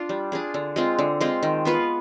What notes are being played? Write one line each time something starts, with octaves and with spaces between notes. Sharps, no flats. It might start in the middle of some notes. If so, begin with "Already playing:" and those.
Already playing: D4 F4
G3
D4 F4 G#4
D3
G#3 C4 F4
D3
G#3 C4 F4
D#3
B3 F4 B4